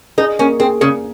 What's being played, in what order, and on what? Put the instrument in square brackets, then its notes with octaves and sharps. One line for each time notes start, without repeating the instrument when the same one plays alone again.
[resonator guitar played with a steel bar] D#4 [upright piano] G#4
[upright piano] A#3 [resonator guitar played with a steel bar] C#4
[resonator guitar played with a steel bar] C4 [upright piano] G#4
[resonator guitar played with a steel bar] C#3 [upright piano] G#4